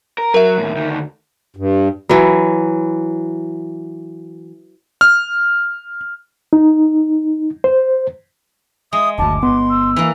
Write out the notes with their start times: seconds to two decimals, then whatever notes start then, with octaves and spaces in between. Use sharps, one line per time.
0.18 A#4
0.34 F#3 A#4 E5
0.58 D#2 A2
0.76 D2 D#3
1.56 G2
2.09 E3 F#3
5.01 F6
6.53 D#4
7.64 C5
8.93 G#3 E5 D#6
9.18 F#1 D2 A5 D6
9.43 G1 B3 C6
9.70 E6
9.96 E3 A#3